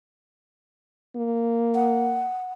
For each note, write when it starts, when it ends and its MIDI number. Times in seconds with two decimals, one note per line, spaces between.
1.16 2.28 58
1.75 2.53 78